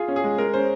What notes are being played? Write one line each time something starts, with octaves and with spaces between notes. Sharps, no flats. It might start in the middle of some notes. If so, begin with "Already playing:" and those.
Already playing: F4 G#4
C#4
G#4
G#3
G#3 A#4
C#4 C5